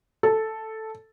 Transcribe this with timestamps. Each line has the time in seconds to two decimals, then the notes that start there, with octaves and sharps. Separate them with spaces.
0.23 A4